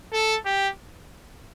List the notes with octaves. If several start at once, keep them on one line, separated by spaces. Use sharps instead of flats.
A4
G4